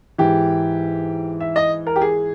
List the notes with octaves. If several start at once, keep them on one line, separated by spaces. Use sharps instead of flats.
G#2 E3 G4
E5
D#5
A#4
G4
G#4